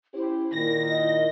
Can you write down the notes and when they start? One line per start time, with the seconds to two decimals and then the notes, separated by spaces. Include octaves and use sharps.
0.14 C#4 E4 G4 C5
0.53 A#2 D#3 A#6
0.89 D#5